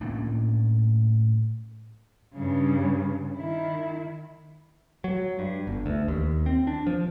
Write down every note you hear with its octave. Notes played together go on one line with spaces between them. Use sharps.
A2 A#3 C#4 D4
G2 C#3
D#3 E4
F#3
G2
G1
D2
D#2
C4
D4
F3